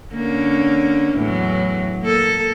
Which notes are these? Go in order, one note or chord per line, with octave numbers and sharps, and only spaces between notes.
D3 A#3 C#4
E2 A2 F#3
A#3 A4